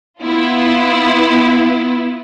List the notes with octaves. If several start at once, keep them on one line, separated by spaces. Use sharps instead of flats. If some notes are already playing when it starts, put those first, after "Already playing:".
B3 E4 F4